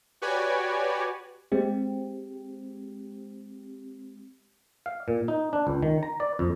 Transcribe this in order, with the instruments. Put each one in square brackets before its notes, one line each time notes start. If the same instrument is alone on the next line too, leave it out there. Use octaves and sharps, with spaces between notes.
[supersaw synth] F#4 G4 B4 C#5 D5 G#5
[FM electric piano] G#3 C4 G4
[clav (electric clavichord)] F5
A#2
D#4
D4
C#2
D#3
A#5
D5
F2